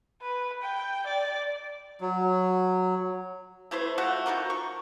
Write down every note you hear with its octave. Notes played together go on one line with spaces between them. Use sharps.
B4
G5
D5
F#3
A3 E4 B4 C5
F3 A3 F#4 F#5
F3 D#4 F#4 A#4
C#6